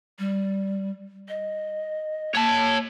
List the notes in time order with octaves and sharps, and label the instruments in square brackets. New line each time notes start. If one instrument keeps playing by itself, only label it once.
[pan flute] G3
D#5
[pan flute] A#3 [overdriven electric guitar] C#5 A5